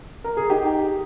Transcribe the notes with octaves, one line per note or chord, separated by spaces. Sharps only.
A#4
G#4
D#4 G4